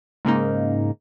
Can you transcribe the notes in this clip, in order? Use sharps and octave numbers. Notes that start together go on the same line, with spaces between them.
G#2 C#3 A#3 D#4